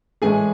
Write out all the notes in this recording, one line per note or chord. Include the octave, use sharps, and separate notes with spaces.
A2 E3 G#3 G#4 G#5